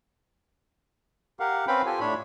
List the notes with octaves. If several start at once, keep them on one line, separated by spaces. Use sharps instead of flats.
G4 A#4 F5 F#5
C4 C#4 B4 F5 G5 B5
F4 G4 A4 G#5
A2 D4 C#5 B5